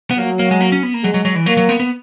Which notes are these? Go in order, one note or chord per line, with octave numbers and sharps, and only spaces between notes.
B3
F#3 A#3
A#3
G#3
A#3
C#4
B3
A#3
F#3 G#3
F#3
F#3
E3
F#3 A#3
F#3
B3
B3